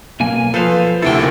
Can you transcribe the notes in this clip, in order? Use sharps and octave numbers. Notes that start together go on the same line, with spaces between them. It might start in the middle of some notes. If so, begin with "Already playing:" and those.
B1 A#3 G#5
F3 A4 B4 C5 F5
D2 C3 E4 A4 G5
D2 A#2 D#3